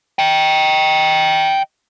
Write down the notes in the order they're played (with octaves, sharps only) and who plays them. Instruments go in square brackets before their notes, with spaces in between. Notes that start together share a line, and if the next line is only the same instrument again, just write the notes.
[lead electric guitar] D#5 G5